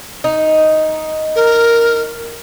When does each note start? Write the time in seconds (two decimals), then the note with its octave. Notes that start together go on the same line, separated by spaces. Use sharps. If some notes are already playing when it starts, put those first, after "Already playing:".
0.24 D#4
1.36 A#4